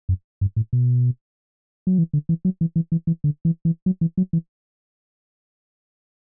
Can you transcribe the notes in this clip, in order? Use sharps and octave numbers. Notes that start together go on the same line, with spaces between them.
F#2
G2
A2
B2
F#3
E3
D3
E3
F#3
E3
E3
E3
E3
D3
E3
E3
F#3
E3
F#3
E3